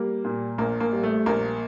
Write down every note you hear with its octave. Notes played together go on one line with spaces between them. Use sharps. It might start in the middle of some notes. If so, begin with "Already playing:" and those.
Already playing: G3 A#3
A#2
A#1 A#3
A#3
G3
A3
A#1 A#3